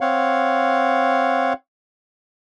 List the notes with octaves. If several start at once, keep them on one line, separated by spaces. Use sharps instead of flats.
C4 C#5 F5 F#5